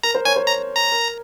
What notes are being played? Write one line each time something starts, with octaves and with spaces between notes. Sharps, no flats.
A#4 A#5
C5
C#5 G#5
C5
A#5
A#5
A#4